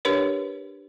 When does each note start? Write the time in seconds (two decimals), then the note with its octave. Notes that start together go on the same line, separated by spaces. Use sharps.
0.05 D4 G4 A#4 B4 C#5